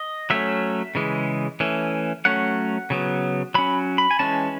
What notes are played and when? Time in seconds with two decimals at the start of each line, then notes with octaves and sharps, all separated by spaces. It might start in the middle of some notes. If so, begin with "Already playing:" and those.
Already playing: D#5
0.30 F#3 A3 C#4 E5
0.95 C#3 E3 G#3
1.60 E3 A3 C#4
2.25 F#3 A3 C#4 F#5
2.90 C#3 F#3 B3
3.54 F#3 C#4 B5
3.98 B5
4.11 G#5
4.19 E3 G#3 C#4 A5